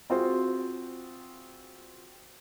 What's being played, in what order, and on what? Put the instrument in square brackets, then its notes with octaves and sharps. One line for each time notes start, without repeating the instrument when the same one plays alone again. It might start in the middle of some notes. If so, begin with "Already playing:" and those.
[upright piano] C4 F4 F#4 G#4 C5